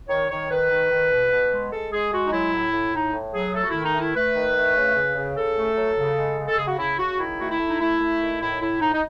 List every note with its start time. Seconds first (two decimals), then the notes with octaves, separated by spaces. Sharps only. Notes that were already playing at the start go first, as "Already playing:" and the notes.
0.09 D#3 C#5
0.29 D#3 C#5
0.50 D#3 B4
0.70 D#3
0.90 D#3
1.11 B2
1.31 B2
1.52 G#3
1.71 G#3 A4
1.92 G#3 G#4
2.12 G#3 F#4
2.27 D#4
2.32 F#3 E4
2.53 A2
2.73 A2
2.93 A2 D#4
3.13 A2
3.33 F#3 G#4
3.54 A3 A4
3.63 F#4
3.69 D#3 E4
3.84 D#4
3.94 A3
4.00 E4
4.15 A3 B4
4.34 D#3
4.56 A3
4.76 C#3
4.95 C#3
5.16 C#3
5.36 C#3 A4
5.57 A3
5.77 F#3
5.97 C#3
6.17 G#3
6.38 C#3
6.48 A4
6.57 C#3 G#4
6.68 F#4
6.78 C#3 E4
6.99 C#3 F#4
7.18 D#3 E4
7.38 A3 F#4
7.49 E4
7.60 A3
7.68 D#4
7.80 A3 E4
8.00 A3
8.20 D#3
8.41 A2 E4
8.61 A2 E4
8.81 A2 D#4
8.93 D#4